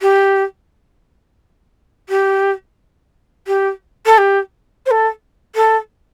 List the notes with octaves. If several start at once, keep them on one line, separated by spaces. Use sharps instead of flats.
G4
G4
G4
A4
G4
C5
A4
A4